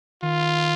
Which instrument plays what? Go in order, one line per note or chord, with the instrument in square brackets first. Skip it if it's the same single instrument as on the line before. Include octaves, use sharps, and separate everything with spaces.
[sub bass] D#3 [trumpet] F4